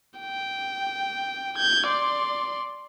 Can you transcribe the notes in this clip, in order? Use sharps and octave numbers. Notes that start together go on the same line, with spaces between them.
G5
G6 G#6
D5 C6